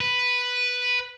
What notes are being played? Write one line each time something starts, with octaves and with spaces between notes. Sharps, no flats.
B4